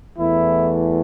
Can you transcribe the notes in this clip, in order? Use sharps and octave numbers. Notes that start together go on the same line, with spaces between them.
E2 E3 A3 E4